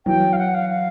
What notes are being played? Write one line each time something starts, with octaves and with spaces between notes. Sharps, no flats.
E3 F#3 G5
F5
F#5
F5
F5